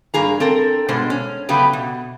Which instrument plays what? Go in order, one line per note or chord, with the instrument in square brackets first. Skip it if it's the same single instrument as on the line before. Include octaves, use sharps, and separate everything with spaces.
[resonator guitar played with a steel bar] G2 A#3 G#4 A#5
C4 A4 A#4
G2 B2 G#3 C5
C#4
C#3 F#3 A3 B3 G4 B4
B2